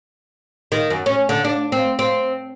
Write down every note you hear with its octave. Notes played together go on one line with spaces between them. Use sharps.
D#3
F#2
C#4
D3
D4
C4
C4